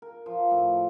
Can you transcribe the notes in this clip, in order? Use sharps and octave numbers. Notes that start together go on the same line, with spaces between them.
A#4
F3
A2